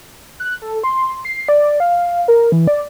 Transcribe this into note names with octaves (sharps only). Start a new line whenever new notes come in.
F#6
A4
C6
C7
D5
F5
A#4
E3
D5